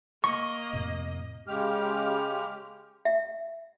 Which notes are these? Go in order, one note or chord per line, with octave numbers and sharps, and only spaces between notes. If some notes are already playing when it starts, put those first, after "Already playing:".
A#3 D#5 C#6
F2 A2 C3
C#3 G#3 G4 F6
E5